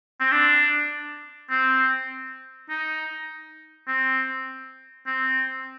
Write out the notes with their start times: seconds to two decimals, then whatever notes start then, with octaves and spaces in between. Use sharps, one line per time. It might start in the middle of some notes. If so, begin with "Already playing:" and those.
0.20 C4
0.32 D4
1.50 C4
2.69 D#4
3.88 C4
5.07 C4